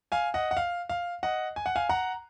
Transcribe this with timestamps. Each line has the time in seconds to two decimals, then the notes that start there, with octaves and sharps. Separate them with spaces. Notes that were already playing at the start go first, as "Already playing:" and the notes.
0.12 F5 G#5
0.34 D#5 F#5
0.51 F#5
0.57 F5
0.89 F5
1.23 D#5 F#5
1.56 G#5
1.66 F#5
1.76 F5 G#5
1.89 F#5 A#5